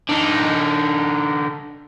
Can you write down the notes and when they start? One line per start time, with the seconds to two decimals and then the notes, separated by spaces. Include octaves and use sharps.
0.09 D3 D#4